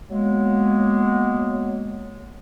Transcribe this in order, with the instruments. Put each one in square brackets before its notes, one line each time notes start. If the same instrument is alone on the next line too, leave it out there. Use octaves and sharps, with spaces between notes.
[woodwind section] F#3 G#3 A#3 B3